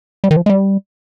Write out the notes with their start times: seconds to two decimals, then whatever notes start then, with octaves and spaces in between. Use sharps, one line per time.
0.24 G3
0.31 D#3
0.36 F3
0.46 G#3
0.49 G3